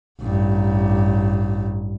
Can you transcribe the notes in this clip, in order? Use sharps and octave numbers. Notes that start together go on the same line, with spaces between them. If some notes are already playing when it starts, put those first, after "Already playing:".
A1 G2